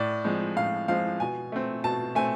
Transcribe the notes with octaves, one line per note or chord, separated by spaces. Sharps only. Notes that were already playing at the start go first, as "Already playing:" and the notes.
Already playing: A2 D5
F3 G#3 C4
A2 F5
F3 G#3 C4 F5
B2 G#5
A3 C4
B2 A5
A3 C4 G#5